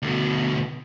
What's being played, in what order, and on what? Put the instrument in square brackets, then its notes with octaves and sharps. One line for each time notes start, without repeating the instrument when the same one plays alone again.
[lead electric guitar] D2 B2